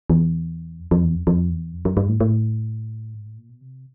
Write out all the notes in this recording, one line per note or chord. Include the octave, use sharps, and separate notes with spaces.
E2
F2
F2
E2
F2
F2
E2
F2
F#2
G2
A2
A2
G#2
A2
A#2
B2
C3